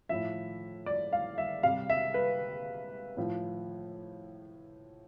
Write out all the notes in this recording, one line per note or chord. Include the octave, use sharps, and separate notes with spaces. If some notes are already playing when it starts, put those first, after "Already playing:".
A2 F3 E5
D5
F5
E5
C3 G3 F5
E5
B4
A2 F3